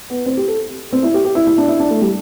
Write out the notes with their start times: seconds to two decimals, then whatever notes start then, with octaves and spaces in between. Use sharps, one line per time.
0.10 B3
0.26 C4
0.37 G4
0.48 A4
0.93 C4
1.03 E4
1.14 G4
1.25 G4
1.35 E4
1.47 E4
1.58 D4
1.68 E4
1.80 D4
1.90 A3
2.02 G3